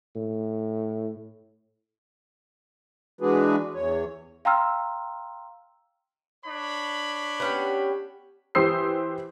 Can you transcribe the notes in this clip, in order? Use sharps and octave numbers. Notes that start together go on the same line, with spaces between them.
A2
E3 G#3 D4 F#4 G#4 B4
E2 C#5
F5 G5 A#5 C6 E6 F6
D4 C#5 B5
B3 C#4 G4
E3 G4 C5 D#6 E6 C7